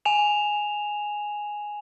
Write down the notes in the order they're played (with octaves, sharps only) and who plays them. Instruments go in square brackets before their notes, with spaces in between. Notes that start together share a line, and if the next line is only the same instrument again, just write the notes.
[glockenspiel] G#5 E7 F7